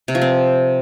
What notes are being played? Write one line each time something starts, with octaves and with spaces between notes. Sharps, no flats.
C3
F3
C4